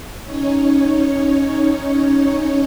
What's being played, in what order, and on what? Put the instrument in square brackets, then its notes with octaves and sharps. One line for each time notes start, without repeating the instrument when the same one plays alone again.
[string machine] C#4 D#4 C#5